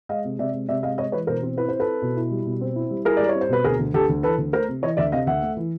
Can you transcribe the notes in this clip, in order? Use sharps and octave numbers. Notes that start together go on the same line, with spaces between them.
G#3 D#5 F5
C3
C3 D5 E5
G#3
C3 D5 E5
G#3 D#5 F5
G#3 C#5 D#5
E3 B4 C#5
B2 A#4 C5
C4
E4 B4
C4 C5
A4 B4
E4
B2
E4
G3
B2
C4
E4
G3
E4 G#4 A#4
G3 D5
C#5
C4
C5
B2 B4
D2 G#4 A#4
D2
D2 G4 A4
D2
E3 A4 B4
D2
A3 A#4 C5
C3
E3 C#5 D#5
D2 D5 E5
C3 D#5 F5
D2 E5 F#5
A3
E3